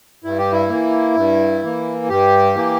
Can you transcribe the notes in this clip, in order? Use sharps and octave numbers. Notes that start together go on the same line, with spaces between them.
G2 E4
G4
E4
E3 A#3
G2
E3 A#3
G2 G4
E3 A#3